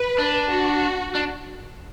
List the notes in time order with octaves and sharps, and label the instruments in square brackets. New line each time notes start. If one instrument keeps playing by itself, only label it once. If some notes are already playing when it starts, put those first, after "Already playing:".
Already playing: [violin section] B4
[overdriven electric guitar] D4
[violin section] F#4
[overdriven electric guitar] D4